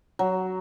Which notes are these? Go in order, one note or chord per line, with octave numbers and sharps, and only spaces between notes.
F#3